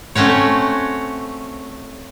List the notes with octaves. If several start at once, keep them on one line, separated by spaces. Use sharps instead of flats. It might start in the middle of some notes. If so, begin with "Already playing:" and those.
A3 C4 C#4 F#4 C#5